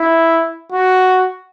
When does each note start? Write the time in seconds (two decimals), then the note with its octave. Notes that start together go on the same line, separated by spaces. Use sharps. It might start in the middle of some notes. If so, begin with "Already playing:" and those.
Already playing: E4
0.72 F#4